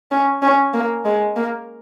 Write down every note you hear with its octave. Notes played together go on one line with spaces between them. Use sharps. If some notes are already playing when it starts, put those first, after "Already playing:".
C#4
C#4
A#3
G#3
A#3